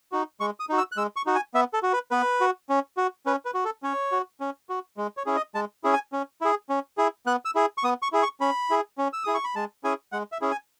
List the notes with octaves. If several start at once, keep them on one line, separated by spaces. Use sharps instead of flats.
D#4 F#4
G#3 C#6
D#6
D#4 F#4
E6
F#6
G#3 E6
C#6
D#4 F#4
G#5
B3 E5
A4
F#4
B4
B3 B4
F#4
C#4
F#4
C#4 B4
B4
F#4
A4
C#4 C#5
F#4
C#4
F#4
G#3
C#5
C#4 E4 G#4
D#5
G#3 A5
C#4 E4 G#4
G#5
C#4
E4 G#4
C#4
E4 G#4
B3 F#6
E6
E4 G#4
C#6
B3 D#6
C#6
E4 G#4
C#6
C#4 B5
E4 G#4
C#4
E6
E4 G#4 D#6
C#6
B5
G#3 A5
C#4 E4 G#4 G#5
G#3 F#5
E5
C#4 E4 G#4
G#5